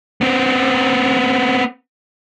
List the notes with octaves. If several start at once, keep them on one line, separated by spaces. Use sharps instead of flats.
B3 C4